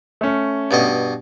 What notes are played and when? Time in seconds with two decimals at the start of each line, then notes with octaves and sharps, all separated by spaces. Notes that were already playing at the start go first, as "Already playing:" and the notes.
0.21 A3 C#4
0.71 G2 B2 D#5